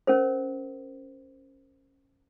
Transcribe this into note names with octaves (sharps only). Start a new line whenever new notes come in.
C#4 A#4 C5